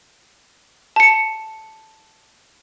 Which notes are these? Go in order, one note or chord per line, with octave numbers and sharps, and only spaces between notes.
A5 C#7